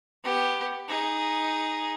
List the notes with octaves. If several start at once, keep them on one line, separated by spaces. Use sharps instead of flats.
B3 G4
D#4 G#4